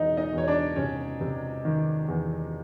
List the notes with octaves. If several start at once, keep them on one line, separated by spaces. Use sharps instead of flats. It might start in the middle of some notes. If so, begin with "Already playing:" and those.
Already playing: E1 E2 D#4 D#5
D#4 D#5
E2
C#5
D4 D5
C3 C#4 C#5
C3
D#3
E2